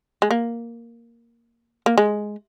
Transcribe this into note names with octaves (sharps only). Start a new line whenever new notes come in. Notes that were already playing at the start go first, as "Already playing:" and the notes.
G#3
A#3
A#3
G#3